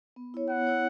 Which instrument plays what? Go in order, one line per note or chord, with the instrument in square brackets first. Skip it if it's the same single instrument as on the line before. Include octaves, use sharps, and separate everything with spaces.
[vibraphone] B3
E4 C#5
[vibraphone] B3 [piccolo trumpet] F#5
[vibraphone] E4 C#5